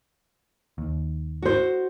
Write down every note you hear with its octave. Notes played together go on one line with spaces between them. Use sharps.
D#2
F#4 C5